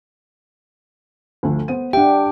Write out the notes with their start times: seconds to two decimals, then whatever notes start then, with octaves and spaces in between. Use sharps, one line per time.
1.43 D2 F3 A3
1.68 B3 C5 D#7
1.93 D4 G4 E5 F#5 G5